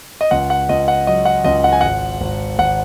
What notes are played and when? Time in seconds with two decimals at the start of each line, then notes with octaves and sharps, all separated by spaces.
0.21 D#5
0.31 C#2 F#5
0.50 F#5
0.69 C#2 D#5
0.88 F#5
1.07 F#3 D#5
1.25 F#5
1.44 C#2 D#5
1.64 F#5
1.72 G#5
1.81 G#1 F#5
2.21 G#1
2.59 G#1 F#5